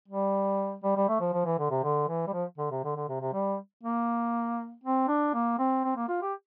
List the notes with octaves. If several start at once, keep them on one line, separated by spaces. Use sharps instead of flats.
G3
G3
G3
A3
F3
F3
E3
D3
C3
D3
E3
G3
F3
D3
C3
D3
D3
C3
C3
G3
A#3
C4
D4
A#3
C4
C4
A#3
F4
G4